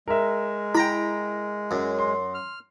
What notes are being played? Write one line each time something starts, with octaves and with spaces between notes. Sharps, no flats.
G#3 A#4 E5
E4 G5 A#5 B5
F#2
C6
F6